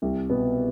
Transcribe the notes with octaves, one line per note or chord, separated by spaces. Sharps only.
C2
B2 B3